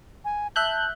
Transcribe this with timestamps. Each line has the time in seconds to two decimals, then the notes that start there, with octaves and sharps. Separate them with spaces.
0.25 G#5
0.56 E5 A5 F#6 G6